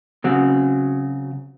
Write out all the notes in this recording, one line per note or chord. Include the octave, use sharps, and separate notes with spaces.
C#3 F#3 C4 F#4